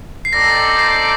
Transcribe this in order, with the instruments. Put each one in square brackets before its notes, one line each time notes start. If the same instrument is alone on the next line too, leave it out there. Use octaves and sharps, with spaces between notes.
[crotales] C7
[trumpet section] C4 D#4 A4 D5 [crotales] A#6
[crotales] A#6
C7